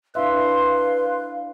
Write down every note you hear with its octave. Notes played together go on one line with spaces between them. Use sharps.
D4 E4 B4 E5 F5 C6